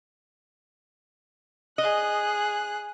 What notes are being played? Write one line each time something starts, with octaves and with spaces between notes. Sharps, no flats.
G#4 D#5 F#6